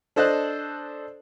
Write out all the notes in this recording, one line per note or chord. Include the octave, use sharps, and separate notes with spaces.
D4 A4 C5 D#5 A5 F#6